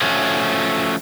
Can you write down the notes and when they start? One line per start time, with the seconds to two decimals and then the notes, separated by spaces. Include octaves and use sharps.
0.02 F3 A3 C#4 F#4